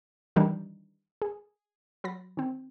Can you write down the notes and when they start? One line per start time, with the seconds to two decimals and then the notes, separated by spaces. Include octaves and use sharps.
0.36 D#3 E3 G3 D4 D#4
1.22 G#4
2.04 F#3 B5 A6 A#6
2.37 D#3 C4